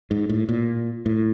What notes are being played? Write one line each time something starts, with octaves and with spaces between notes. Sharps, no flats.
G#2
A2
A#2
A2